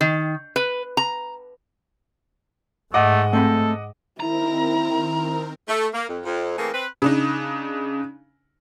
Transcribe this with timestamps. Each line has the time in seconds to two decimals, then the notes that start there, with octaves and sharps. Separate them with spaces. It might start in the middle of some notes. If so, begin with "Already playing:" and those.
0.01 D#3
0.56 B4
0.97 A#5
2.94 G#2 A3 D#5 F#5 D6
3.33 A3 C4 A4 B5
4.20 D#3 C4 E4 A#4 A#5
5.68 A3
5.94 A#3
6.09 F2
6.25 F2
6.58 E3 A3 A#3 C4 G#4 A#4
6.74 C4 B4
7.02 C#3 D4 D#4